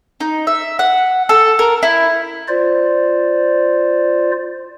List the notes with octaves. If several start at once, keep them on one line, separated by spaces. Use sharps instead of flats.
D#4
E5
F#5
A4
A#4
E4
F4 C5 D5